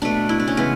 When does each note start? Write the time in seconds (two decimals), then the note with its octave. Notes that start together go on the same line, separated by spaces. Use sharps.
0.02 B2 A3 D4
0.29 E4
0.40 D4
0.48 C#4
0.57 C#3 E3 G#3 B3